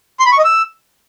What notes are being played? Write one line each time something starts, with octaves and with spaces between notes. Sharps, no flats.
C6
B5
C#6
D#5
E6